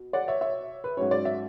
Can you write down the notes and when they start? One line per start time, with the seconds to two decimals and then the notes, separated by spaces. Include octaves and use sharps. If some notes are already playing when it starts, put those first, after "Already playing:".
Already playing: B2
0.13 D5 F#5
0.28 C#5 E5
0.41 C#5 E5
0.84 B4
0.97 G#2 F#3 C#4 C#5
1.11 D5
1.25 E5